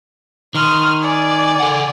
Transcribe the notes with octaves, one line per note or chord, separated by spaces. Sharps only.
D#3 C6 D#6 F6
D5 G#5
A4 F#5